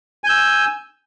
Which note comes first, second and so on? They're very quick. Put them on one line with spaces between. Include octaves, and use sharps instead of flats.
G#5 G6 E6